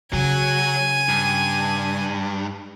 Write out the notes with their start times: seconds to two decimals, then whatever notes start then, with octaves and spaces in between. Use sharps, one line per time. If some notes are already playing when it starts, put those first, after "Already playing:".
0.13 C#3 F#3 G#5
1.09 G2